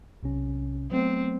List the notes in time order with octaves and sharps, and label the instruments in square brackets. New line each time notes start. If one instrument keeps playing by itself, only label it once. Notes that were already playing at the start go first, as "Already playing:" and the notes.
[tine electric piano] B1 C3 C#4
[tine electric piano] F#3 A3 B3 [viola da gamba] C4